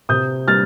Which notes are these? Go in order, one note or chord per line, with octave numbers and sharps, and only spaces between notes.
C3 D#6 G6
G3 F6 A6